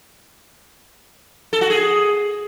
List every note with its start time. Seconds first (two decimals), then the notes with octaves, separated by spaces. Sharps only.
1.53 A4
1.61 F#4
1.70 G#4